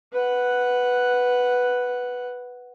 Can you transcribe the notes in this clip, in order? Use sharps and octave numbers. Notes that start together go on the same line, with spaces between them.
B4 F#5